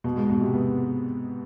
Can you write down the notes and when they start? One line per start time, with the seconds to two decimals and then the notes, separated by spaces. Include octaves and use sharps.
0.04 B2
0.16 G#2
0.29 B2
0.41 C3
0.53 B3